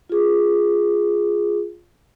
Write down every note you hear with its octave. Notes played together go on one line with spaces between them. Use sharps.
F4 G#4